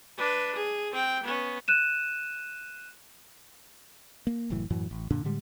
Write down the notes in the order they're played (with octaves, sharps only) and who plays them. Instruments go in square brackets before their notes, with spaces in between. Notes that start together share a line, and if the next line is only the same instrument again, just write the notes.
[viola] D4 B4
G#4
C4 G5
B3 C#4
[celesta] F#6 D#7 E7
[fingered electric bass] A#3
F#1 F#2 A2 E3
F#2 A2 E3 F#3
A1
F#2 A#2 D3 D4
A2 D3 G3 G#3